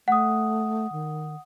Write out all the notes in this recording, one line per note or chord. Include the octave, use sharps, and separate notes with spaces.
A3 F#5 D#6
D#3